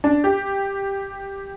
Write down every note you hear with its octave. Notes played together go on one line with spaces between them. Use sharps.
D4
G4